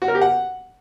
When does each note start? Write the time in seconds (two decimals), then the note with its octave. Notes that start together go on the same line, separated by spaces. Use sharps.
0.02 F#4
0.08 A#4
0.15 G4
0.21 F#5